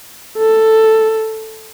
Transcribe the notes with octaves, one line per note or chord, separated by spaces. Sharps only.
A4